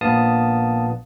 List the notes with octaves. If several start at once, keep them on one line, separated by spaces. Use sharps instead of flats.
A#1 A#2 B3 F5 A5 D#6